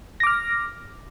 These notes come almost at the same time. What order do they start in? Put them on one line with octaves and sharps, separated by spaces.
A#6 D6 F6